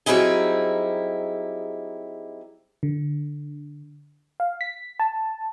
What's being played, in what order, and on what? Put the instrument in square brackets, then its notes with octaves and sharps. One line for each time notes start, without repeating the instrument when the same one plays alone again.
[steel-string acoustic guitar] F#3 G3 C4 D#4 E4 G#4
[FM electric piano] D3
F5
B6
A5